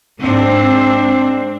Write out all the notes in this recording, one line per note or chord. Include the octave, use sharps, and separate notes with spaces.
G#2 C4 D4